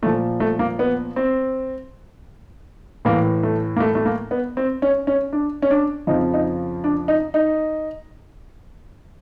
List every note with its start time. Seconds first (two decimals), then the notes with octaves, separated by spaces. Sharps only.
0.03 A#2 A3
0.06 F3
0.40 A3
0.59 A#3
0.79 B3
1.16 C4
3.05 A2 E3 A#3
3.43 A3
3.76 A#3
3.80 A3
3.95 A3
4.06 A#3
4.31 B3
4.57 C4
4.82 C#4
5.07 C#4
5.33 D4
5.62 C#4
5.71 D4
6.07 F2 C#3 F3 D#4
6.34 D#4
6.84 D4
7.08 D#4
7.34 D#4